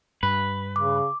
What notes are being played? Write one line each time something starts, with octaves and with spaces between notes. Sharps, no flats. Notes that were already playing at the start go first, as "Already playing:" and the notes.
G2 B4
C#3 D6